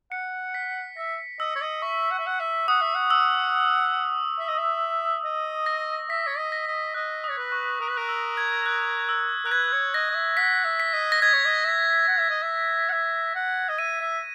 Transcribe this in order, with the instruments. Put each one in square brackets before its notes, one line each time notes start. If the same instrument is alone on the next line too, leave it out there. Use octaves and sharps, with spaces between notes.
[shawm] F#5 [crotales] C#7
[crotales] B6
[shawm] E5 [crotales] A#6
[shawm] D#5 [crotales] E6
[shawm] C#5
D#5
[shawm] E5 [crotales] C#6
[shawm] F#5
E5
F#5
E5
[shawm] F#5 [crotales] D#6
[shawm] E5
F#5
[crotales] E6
[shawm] E5
D#5
E5
D#5
[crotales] A#6
[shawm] E5 [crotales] B6
[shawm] C#5
D#5
[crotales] A#6
[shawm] D#5
[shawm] D#5 [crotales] F#6
[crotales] D#6
[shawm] C#5
B4
[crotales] C#6
C#6
[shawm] A#4 [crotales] D#6
[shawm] B4
[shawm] A#4 [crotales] F#6
[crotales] E6
G#6
F#6
E6
[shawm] A#4 [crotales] F#6
[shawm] B4 [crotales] G#6
[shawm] C#5
[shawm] D#5 [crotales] A#6
[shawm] D#5
E5
[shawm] F#5 [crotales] B6
[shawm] E5
[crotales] B6
[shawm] D#5
[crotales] A#6
[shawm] D#5 [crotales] G#6
[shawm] C#5
D#5
E5
F#5
E5
D#5
E5
F#5
E5
F#5
D#5
[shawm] E5 [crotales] D#7
[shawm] E5